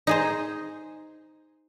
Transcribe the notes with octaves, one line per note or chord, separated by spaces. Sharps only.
D#4 G#4 C5